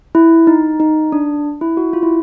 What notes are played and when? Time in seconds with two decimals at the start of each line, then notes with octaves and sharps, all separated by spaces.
0.15 E4
0.47 D#4
0.80 D#4
1.12 D4
1.61 E4
1.77 F#4
1.93 F4
2.03 E4